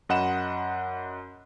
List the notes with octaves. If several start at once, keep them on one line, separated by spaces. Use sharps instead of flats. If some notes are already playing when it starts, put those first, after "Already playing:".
F#2 D#5 F#5 B5 E7